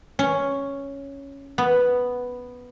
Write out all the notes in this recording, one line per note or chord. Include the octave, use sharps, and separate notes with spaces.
C#4
B3